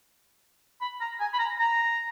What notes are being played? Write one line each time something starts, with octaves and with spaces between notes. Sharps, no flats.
B5
A#5
G#5
B5
A#5
A#5